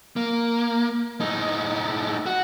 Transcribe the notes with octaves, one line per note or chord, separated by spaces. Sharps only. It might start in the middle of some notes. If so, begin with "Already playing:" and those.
A#3
A2 D#4
F#4